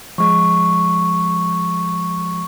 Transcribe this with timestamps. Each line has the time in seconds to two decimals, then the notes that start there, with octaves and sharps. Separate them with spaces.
0.18 F3 G#3 C#6